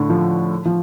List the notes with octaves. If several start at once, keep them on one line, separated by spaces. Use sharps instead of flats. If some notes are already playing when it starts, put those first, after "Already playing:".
Already playing: A2 D3
F3
F3